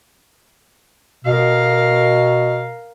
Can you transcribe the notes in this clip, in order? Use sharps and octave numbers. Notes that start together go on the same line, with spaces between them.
B2 A#4 F5